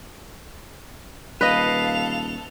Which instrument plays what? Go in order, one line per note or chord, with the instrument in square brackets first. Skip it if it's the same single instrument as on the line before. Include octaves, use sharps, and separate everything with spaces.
[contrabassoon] D#1 [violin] A4 F7 [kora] B4 D#5 [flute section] F5